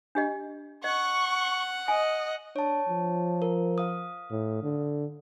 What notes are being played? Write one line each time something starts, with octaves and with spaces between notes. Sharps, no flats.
D4 G4 D#5
D#5 F#5 C#6
D#5 G#5
D4 C#5 A5
F3
A#4
F5 D#6
A2
D3